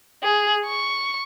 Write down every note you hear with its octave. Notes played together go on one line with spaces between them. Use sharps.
G#4
C#6